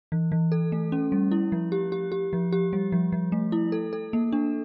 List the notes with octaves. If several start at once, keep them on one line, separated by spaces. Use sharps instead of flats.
E3
E3
A4
A3
C#4
G3
E4
F3
G4
G4
G4
F3
G4
G3
F3
F3
A3
E4
A4
A4
A#3
D4